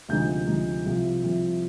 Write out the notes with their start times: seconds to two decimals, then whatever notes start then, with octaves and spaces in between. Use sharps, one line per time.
0.09 D2 C3 F3 G#3 D#4 G6
0.47 D2 C3 F3 G#3 D#4
0.86 C2 C3 F3
1.24 C2 C3 F3